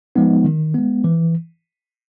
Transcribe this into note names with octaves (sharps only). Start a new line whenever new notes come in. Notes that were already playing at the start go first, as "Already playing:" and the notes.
F3 G#3 B3 D#4
D#3
G#3 B3
E3